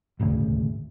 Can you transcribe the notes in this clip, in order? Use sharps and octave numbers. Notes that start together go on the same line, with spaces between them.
D#1 G#1 D2 C#3